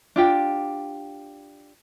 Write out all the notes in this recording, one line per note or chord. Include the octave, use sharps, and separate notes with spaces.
D4 F4 G4